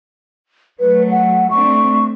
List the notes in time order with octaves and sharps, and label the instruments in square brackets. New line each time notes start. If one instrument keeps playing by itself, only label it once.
[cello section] F#3 A3 [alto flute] B4
[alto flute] F#5
[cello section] A3 C4 D4 [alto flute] C#6